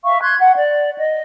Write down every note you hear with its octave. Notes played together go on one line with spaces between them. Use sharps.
E5 F5 C#6
C6 F#6 G#6
F#5
D5
D#5